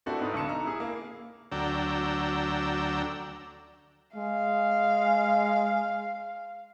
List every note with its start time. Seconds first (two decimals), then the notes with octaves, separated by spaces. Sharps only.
0.06 A3 C4 D4 E4 F#4 A4
0.19 G#2 B3 D#4
0.34 B1 D3 D#4 C#7 E7
0.49 A#5
0.64 E4 G#4
0.80 A#3
1.52 D2 F#3 D4 G5 A#5 E6
4.16 G#3 F5